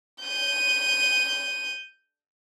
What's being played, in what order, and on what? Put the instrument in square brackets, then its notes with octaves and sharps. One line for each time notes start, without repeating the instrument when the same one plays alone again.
[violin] G6 D#7